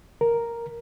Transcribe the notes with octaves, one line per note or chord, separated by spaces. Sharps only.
A#4